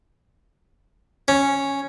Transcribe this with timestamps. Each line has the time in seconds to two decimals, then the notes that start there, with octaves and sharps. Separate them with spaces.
1.28 C#4